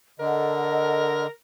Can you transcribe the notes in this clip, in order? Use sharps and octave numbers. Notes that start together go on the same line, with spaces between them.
D3 A4 A#4 D#5 F#5